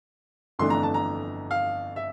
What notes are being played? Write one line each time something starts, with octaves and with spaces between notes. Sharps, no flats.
G1 F2 E3 A3 D4 C6
A#5
A5
A#5
F5
E5